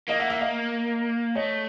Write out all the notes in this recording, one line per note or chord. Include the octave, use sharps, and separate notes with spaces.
A#3 D#5 F5
E5 F#5
E5 F#5
D#5 F5
A3 C#5 D#5